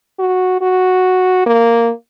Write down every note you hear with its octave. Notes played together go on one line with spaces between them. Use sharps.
F#4
F#4
A#3